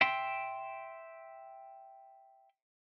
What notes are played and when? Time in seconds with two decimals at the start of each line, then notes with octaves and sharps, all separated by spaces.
0.01 E5 G5 C6